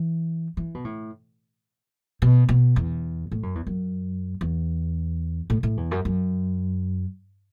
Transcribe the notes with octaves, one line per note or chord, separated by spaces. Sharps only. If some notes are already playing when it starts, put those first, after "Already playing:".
Already playing: E3
E3
B2
A2
B2
B2
E2
A2
F#2
E2
F#2
E2
A2
A2
E2
F#2
F#2